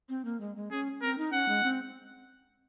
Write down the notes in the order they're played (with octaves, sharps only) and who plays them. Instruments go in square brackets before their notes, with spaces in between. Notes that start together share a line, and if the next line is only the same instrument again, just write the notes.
[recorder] C4
A#3
G#3
G#3
[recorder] C#4 [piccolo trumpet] G#4
[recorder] C4 [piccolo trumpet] A#4
[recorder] D#4
[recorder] C#4 [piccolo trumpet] F#5
[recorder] G#3
C4